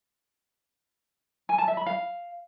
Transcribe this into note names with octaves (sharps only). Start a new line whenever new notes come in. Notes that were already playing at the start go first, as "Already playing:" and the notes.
G#5
A5
E5
B5
F5